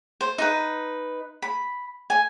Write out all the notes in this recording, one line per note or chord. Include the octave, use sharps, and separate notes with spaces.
C5
D#4 B4
B5
G#5